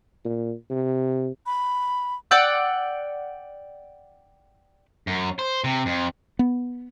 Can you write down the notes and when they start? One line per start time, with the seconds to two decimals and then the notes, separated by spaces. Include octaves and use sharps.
0.25 A#2
0.70 C3
1.46 B5
2.31 D5 F#5 G5 E6
5.07 F#2
5.39 C5
5.64 C3
5.86 F2
6.39 B3